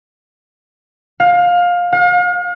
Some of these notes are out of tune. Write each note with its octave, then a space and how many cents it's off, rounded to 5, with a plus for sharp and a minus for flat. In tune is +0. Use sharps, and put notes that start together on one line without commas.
F5 +20
F5 +40